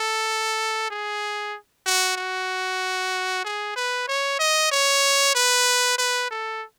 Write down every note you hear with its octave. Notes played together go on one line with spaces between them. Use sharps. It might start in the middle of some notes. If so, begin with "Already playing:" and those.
Already playing: A4
G#4
F#4
F#4
G#4
B4
C#5
D#5
C#5
B4
B4
A4